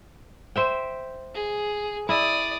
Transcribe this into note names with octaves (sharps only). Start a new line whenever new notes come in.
C5 E5 G5
G#4
E4 D5 D#6